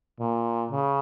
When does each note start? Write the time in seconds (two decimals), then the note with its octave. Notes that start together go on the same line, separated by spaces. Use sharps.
0.20 A#2
0.71 C#3